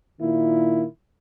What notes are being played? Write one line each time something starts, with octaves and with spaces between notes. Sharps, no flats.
A#2 D#3 A#3 E4